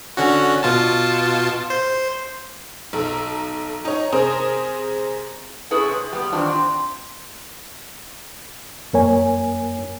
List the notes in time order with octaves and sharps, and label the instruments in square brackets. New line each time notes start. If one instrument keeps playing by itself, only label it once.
[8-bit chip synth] D3 C#4 F#4
B2 F4 A5
C5
[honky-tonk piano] B1 A4 A#5
D#4 C#5
C3 G#4 A#4 C5 D#6
[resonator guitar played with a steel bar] A3 C#4 E4 G#4 B4
C3
G3 B3
D#3 E3 C4 D4 F4
C4
[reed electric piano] F#2 A#3 A#4 C#5 G#5